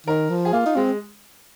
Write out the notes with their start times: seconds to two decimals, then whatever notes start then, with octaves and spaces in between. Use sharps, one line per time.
0.07 D#3 A#4
0.30 F3
0.45 G#4
0.53 A#3 F4
0.66 D#4
0.76 G#3 C4